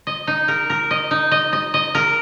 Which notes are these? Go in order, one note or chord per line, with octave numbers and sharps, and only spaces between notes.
D#5
D#4
A#4
A#4
D#5
D#4
D#5
D#5
D#5
A#4